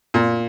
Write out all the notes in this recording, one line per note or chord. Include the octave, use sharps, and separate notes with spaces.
A#2